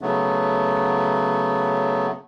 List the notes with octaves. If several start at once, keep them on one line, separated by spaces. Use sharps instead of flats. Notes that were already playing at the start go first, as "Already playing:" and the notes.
C#3 F#3 A3 B3